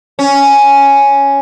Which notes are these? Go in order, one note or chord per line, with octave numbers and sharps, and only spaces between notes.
C#4